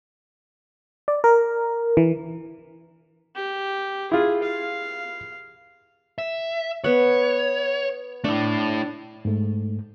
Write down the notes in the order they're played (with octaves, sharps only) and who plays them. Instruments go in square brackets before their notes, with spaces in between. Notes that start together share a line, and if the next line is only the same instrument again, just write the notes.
[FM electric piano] D5
A#4
E3
[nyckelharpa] G4
[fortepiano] E4 F4 [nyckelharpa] G#4
[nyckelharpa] F5
[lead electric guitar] E5
[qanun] B3 F#5 [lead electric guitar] C#5
[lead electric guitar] A3 E4 [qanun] D4
[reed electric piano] G#2 A3